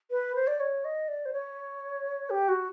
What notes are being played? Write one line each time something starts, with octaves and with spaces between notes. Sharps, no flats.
B4
C5
D5
C#5
D#5
D5
C5
C#5
G4
F#4